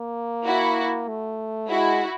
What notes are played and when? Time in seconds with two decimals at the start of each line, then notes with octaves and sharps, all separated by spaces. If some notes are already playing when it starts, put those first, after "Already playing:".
Already playing: A#3
0.46 E4 F#4
1.08 A3
1.69 G#3 E4 F#4